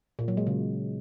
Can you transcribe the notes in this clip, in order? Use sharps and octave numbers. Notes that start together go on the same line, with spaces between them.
A#2
F#3
G#3
C#3